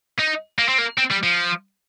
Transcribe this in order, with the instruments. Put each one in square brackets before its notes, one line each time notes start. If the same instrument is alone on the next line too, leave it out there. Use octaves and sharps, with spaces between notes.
[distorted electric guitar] D#4
A#3
C4
A#3
C4
G3
F3